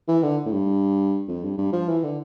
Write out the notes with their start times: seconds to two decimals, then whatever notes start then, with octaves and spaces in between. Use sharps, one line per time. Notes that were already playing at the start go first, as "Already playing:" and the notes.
0.08 E3
0.23 D3
0.46 A2
0.53 G2
1.28 F2
1.43 G2
1.58 G2
1.73 F3
1.88 E3
2.03 D3